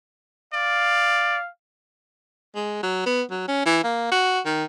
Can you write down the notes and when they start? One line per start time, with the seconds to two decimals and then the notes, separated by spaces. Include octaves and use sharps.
0.54 D5 F5
2.55 G#3
2.83 F#3
3.06 B3
3.31 F#3
3.48 C#4
3.66 E3
3.84 A#3
4.12 F#4
4.45 D#3